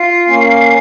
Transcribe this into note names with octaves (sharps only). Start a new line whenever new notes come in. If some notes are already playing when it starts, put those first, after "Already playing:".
Already playing: F4 C7
A#3 C#4